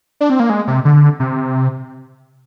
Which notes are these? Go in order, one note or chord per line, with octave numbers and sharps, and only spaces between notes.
D4
C4
A#3
G#3
C3
D3
C3